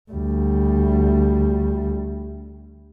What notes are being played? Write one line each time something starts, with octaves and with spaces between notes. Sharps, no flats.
D2 G3